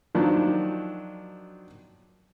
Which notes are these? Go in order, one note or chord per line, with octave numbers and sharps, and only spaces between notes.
D#3 F3 F#3 D4